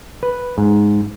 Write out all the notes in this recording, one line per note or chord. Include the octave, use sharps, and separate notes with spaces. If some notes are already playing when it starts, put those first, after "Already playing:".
B4
G#2